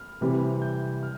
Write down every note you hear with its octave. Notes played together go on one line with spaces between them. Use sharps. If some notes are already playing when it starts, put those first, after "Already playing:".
Already playing: F6
C3 E3 G3 C4
G6
F6